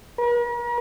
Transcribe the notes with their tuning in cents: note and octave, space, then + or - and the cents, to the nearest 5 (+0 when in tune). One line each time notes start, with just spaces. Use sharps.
A#4 +45